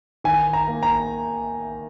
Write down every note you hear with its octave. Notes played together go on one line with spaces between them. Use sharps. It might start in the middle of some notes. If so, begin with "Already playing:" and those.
D#3 G#5
A#5
A#3
A#5